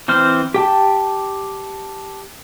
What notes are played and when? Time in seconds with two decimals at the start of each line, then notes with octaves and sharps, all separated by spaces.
0.08 E3 C4 C5 F6
0.54 G4 G5 A5